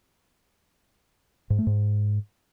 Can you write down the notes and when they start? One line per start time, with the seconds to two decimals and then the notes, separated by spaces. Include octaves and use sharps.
1.50 G#2
1.58 A3
1.67 G#2